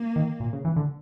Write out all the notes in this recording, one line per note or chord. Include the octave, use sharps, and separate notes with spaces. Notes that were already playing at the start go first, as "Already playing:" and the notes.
Already playing: A#3
D#3
A#2
C#3
E3
D3